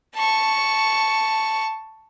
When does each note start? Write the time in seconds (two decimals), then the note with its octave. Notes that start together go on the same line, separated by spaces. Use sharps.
0.15 A5 C#6